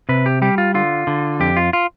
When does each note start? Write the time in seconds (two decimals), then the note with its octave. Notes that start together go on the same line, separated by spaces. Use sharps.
0.09 C3 B4
0.26 G4
0.42 G3 G4
0.58 F4
0.74 D3 F4
1.07 D3
1.40 F2 G4
1.57 F4
1.73 F4